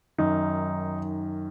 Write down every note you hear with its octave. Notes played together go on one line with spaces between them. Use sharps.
F#2 D#3 D#4